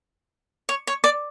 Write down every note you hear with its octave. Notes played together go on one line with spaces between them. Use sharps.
C#5
C#5
D5